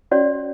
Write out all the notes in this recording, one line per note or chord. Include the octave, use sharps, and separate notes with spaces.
C#4 F#4 C#5 D5